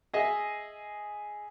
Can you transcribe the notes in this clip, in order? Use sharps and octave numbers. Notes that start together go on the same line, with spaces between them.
G#4 D#5 E5